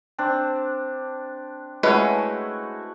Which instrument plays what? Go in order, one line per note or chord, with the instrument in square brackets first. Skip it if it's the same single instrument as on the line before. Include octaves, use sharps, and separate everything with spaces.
[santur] C4 D4
[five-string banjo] G#3 C#4 B4 [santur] A3 E4 F#4